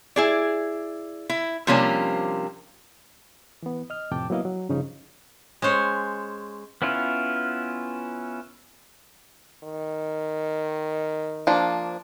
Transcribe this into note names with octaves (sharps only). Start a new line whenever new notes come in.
E4 G#4 D5
E4
C3 F3 G3 A#3 C#4 D4
E3 B3
D#5 F6
F2 A2 C3 G5 A5 D6
F#3 A#3 B3 E4 D#5 F5
F#3
G2 C#3 F3 C#4 D#4
G#3 C#4 C5 C#5
B3 C#4 E4 F4
D#3
F3 A#3 D4